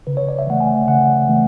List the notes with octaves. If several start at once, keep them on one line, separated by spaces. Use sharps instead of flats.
C#3 B4
C#5
D5
E5
E3 A3 F#5
G#5
C#3 F#5
E3 A3